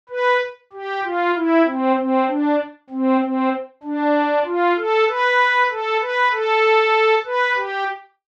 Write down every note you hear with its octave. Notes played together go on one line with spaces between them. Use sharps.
B4
G4
F4
E4
C4
C4
D4
C4
C4
D4
F4
A4
B4
A4
B4
A4
B4
G4